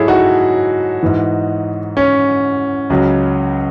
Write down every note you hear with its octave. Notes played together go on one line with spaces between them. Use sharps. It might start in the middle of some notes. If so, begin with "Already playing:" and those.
Already playing: G#2 F#3 E4 G#4 A4 C#5
D#4 F#4
G#2 E3
C#4
C#2 C#3 F#3